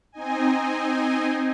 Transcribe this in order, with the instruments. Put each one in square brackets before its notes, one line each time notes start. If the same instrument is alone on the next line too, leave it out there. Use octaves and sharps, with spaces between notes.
[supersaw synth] C4 D#4 D#5 G#5